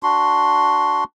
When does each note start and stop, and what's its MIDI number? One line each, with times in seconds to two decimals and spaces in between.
0.03 1.04 62
0.03 1.04 66
0.03 1.04 84